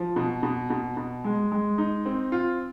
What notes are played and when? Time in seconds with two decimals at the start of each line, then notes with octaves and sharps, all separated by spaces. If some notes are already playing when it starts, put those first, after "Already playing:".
Already playing: F3
0.16 B2
0.43 B2
0.70 B2
0.97 B2
1.24 G#3
1.52 G#3
1.78 D#4
2.06 C4
2.32 F4